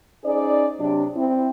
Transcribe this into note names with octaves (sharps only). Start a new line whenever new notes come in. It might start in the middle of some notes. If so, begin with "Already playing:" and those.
C#4 D#4 G#4 C5 D5
C3 F#3 D4
C4 E4